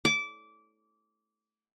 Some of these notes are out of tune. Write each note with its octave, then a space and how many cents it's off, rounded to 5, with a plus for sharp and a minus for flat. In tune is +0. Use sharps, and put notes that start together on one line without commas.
D6 -20